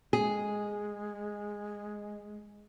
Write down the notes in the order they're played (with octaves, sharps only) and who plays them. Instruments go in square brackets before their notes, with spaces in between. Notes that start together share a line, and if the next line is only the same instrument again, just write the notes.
[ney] G#3 [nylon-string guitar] G#4